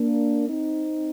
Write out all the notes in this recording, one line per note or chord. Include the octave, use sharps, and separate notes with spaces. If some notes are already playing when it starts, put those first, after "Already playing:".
Already playing: A#3 D4
C4 D#4